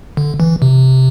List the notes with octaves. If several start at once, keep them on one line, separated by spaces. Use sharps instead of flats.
D3
E3
C3